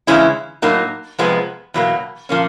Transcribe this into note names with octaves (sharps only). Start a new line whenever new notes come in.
C#3 E3 G#3 C#4 E4
A2 F#3 A#3 D#4
F2 C3 F3 G#3 B3
E2 B2 F#3 A#3
A#2 F3 A#3 C#4